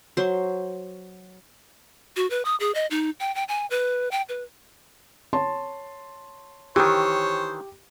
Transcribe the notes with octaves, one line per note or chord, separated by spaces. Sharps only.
F#3 C5
F#4
B4
D#6
G#4
D#5
D#4
G5
G5
G#5
B4
G5
B4
C#5 A5 C6
D#3 E3 G4 C5 C#5